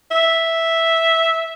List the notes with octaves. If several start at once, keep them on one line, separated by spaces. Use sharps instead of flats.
E5